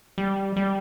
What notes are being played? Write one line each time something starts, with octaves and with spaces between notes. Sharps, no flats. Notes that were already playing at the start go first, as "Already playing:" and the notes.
G3
G3